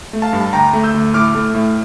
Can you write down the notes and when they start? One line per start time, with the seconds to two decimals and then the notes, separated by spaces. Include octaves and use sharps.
0.13 A3
0.22 F5 A5
0.33 G2
0.41 A5
0.53 D2 G5 A#5
0.73 A3
0.83 E6 G6
0.94 D2
1.14 A2 D6 F6
1.35 A3
1.54 A2